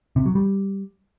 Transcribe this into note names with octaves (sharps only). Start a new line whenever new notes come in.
C3
F#3
G3